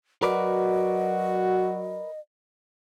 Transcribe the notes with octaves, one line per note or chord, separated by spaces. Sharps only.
F#3 F#4 A#4 B4 D5 D#5